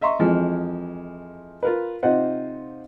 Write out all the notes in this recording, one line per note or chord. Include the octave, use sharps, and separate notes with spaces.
D#5 E5 A#5 C6 C#6
F2 E3 F3 G#3
F4 A#4 B4
C3 D#4 F4 C5 D#5 F#5